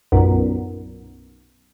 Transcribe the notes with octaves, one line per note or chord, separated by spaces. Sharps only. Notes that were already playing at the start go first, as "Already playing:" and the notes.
B1 F#2 A#2